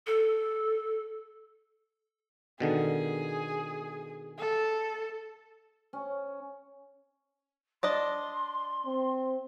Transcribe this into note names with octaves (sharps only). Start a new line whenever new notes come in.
A4
B2 D3 D#3 G#4
A4
C#4
D4 D5 D#5 C6
C4